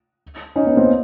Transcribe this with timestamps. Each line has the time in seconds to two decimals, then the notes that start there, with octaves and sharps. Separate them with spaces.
0.56 C#4 D#4
0.66 B3 C#4
0.77 A#3 C4